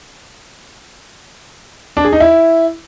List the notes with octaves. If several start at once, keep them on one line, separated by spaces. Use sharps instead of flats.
D4
G#4
D#4
E4